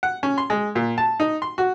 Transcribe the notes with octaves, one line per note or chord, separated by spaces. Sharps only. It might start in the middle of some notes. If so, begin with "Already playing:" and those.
F#5
C#4
C6
G#3
A#2
A5
D#4
C6
F#4